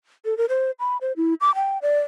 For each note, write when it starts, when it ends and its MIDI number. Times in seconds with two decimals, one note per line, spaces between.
0.25 0.37 69
0.38 0.45 70
0.49 0.71 72
0.80 0.97 83
1.01 1.12 72
1.17 1.34 64
1.41 1.54 86
1.55 1.78 79
1.82 2.00 74